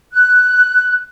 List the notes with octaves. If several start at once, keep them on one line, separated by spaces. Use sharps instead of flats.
F#6